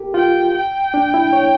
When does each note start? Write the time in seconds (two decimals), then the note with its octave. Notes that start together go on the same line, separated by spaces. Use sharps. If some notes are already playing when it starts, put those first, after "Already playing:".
Already playing: G4 A4 A#4
0.14 F4 G5
0.54 G5
0.94 D4
1.14 E4
1.33 C#5